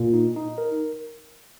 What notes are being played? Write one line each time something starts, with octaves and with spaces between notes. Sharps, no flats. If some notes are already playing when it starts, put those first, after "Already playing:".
Already playing: A#2
D#4
D#4
A#4